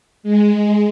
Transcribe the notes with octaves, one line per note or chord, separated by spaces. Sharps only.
G#3